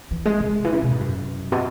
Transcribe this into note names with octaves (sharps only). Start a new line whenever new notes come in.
E3
G#3
C#3
E3
C#3
B2
G#2
F#2
B2